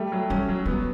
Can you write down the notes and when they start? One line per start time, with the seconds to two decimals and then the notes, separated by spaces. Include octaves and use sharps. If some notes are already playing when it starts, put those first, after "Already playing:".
Already playing: G3 A3
0.12 F#3
0.30 G3 C#4
0.49 F#3
0.66 G3 B3